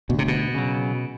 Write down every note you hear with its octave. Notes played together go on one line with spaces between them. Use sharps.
D2 B2
C3
B2
C#3 F#3